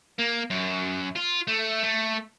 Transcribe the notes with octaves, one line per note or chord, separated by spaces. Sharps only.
A#3
F#2
F4
A3
A3